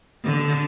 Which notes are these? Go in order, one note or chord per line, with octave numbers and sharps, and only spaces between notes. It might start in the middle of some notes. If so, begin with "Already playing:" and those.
D3